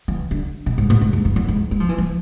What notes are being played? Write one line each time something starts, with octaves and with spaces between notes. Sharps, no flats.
E3
D3
B2
G#2
A2
G#2
G#2
F2
E2
G#2
G#3
F3
E3
F3